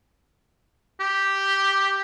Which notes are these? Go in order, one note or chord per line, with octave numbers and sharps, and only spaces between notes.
G4